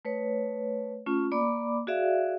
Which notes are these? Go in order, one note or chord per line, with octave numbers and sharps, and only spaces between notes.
A3 B4 C#5
A3 C#4 F4
A#3 D5 B5 D6
F#4 G#4 D5 E5 F5